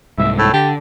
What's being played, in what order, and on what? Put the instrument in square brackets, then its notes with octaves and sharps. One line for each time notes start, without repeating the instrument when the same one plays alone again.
[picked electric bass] C2 G#2 [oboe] E5
[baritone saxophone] A2 [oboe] E6
[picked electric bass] D3 [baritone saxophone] G4 [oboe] A5